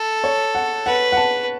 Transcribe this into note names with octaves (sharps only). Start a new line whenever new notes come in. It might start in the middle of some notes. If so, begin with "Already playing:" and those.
Already playing: A4
C#5
F#5
B4 F#5
F#5
A5